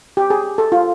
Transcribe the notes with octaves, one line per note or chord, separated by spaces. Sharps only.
G4
G#4
A4
F4